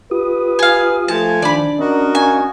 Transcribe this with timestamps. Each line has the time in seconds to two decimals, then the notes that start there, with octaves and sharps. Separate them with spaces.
0.11 F4 G4 B4 D#6
0.59 G#4 F5
1.08 F3 A3 G#5 A5
1.42 D#3 D4 D5 B5
1.79 C#4 F#4 A#4 D#5
2.15 C#4 F5 G#5 C#6